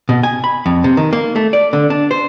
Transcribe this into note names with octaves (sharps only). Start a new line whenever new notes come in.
B2
G#5
B5
F2
C3
D#3
A#3
A3
D5
D3
D4
C5